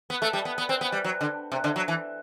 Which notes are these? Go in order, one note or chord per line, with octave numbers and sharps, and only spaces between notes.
B3
A3
G3
B3
B3
C4
B3
G3
F#3
D3
C3
D3
F#3
E3